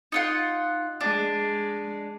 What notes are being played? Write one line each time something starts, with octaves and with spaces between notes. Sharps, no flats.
D#4 F4 F#5
G#3 D4